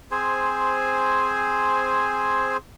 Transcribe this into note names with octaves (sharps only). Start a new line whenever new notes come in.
C4 G#4 C5 G#5